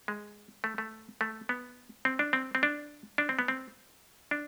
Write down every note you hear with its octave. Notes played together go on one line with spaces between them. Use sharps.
G#3
A3
A3
A3
B3
C4
D4
C4
C4
D4
D4
C4
B3
C4
D4